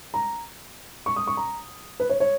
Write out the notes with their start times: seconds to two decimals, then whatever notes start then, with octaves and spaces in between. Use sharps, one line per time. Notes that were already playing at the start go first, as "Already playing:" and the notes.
0.14 A#5
1.06 C#6
1.16 D#6
1.27 C#6
1.37 A#5
2.00 B4
2.10 C#5
2.20 C#5